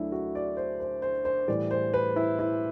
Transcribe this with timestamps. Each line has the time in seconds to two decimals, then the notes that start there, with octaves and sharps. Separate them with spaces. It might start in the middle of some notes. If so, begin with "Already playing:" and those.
Already playing: D2 D3 F#3 A3 D4 E4
0.12 F#4
0.35 D5
0.57 C5
0.80 C5
1.02 C5
1.25 C5
1.48 A2 E3 G3 D5
1.71 C5
1.94 B4
2.16 E4
2.39 E4